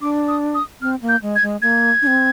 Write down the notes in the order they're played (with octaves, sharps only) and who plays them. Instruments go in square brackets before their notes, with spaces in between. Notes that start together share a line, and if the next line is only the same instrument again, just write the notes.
[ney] D4 [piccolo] D6
[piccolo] D#6
D#6
[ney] C4 [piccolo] F6
[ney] A#3
[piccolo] G6
[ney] G#3
[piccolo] G#6
[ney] G#3
[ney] A#3 [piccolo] G#6
[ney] D4
C4